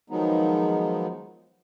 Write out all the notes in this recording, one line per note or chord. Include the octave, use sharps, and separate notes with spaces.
D#3 F3 F#3 G#3 B3 D#4